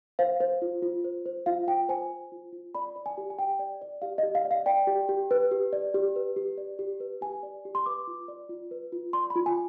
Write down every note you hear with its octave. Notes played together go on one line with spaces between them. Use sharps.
C5 F5
C5
F4
F4
C5
C5
F4 F5
F4 G5
C5 G#5
C5
F4
F4
D5 B5
D5
G#5
G4
G#5
G4 G5
D5
D5
G4 F5
D#5
G4
F5
D5
F5
D5 G5
G4
G4
B4
G4
D5
G4
B4
G4
D5
G4
B4
G4 G#5
D5
G4
C6
B4 D6
F4
D5
F4
B4
F4
D5 C6
B5
F4
G#5